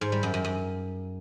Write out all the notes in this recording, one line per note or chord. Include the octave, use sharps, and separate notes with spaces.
G#2
G3
F#2
F#2
F#2